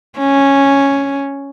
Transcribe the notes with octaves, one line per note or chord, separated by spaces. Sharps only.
C#4